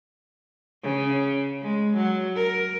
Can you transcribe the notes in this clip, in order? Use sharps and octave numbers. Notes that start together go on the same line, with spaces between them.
C#3
G#3
F#3
A#4